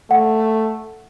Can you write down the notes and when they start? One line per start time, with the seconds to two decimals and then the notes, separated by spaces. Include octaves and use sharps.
0.11 A3 F#5